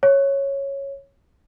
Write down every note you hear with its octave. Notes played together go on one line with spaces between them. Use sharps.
C#5